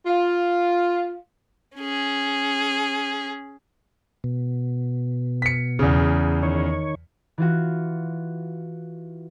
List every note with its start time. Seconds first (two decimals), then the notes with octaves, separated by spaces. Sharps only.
0.06 F4
1.76 C#4 G#4
4.24 B2
5.42 B6 C#7
5.79 E2 C#3
6.43 D#3 C#5
7.38 E3 F4 F#4